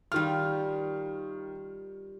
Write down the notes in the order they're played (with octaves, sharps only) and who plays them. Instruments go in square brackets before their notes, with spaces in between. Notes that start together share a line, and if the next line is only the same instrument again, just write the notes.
[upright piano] D#3 F6 [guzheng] G3 F4